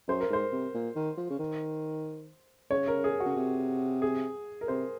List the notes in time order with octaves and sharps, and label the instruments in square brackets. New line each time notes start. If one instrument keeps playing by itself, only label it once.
[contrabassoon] F#2 [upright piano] C5
[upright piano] A#4
[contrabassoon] G#2 [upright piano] C5
[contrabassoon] C3
A#2
D#3
F3
C#3
D#3
[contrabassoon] C#3 [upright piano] C#5
[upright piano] A#4
G#4
F#4
[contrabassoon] C#3
C3
[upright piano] G#4
A#4
[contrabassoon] C3 [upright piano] C5